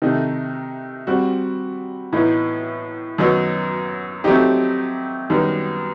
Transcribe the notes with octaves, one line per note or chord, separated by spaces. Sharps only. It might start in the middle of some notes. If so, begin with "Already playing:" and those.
C3 D#3 A3 D#4
G3 C4 F#4
A2 E3 B3 D#4
F#2 D#3 F#3 B3 D#4
F#3 A3 C4 D#4 G4
F#2 D#3 G3 B3 D#4